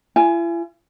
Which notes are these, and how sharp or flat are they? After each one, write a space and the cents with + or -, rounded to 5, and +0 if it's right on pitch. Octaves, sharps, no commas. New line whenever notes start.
E4 +45 G#5 +0